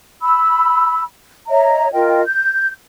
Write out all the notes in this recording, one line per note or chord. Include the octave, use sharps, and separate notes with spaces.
B5 E6
C#5 D#5 E5 A#5
F4 A#4 D#5 G5
G6